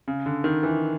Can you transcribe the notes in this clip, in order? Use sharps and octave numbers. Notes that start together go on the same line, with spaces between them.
C#3
D3
D#3
E3